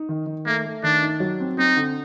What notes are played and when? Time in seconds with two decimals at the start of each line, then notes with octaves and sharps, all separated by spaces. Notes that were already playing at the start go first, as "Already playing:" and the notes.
Already playing: D#4
0.09 D#3
0.26 D#3
0.46 A3 A#3
0.65 A3
0.83 D#3 D4
1.03 D#4
1.20 F#3
1.40 C4
1.58 C4 D#4
1.77 D3